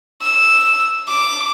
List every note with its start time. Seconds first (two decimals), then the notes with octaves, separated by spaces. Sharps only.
0.22 E6
1.08 D6